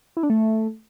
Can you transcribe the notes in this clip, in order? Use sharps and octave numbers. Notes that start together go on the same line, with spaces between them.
E4
D4
A3